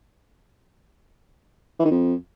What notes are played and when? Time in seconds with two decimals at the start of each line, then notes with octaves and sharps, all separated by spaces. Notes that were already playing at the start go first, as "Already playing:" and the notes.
1.79 E3
1.85 D#3
1.91 F2